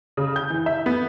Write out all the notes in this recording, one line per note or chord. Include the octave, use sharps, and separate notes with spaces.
C#3
G6
E3
E5
B3